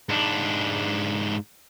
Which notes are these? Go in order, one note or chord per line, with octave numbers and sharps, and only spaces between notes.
G#2 D4